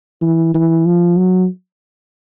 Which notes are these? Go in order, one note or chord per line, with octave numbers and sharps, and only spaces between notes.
E3
E3
F3
F#3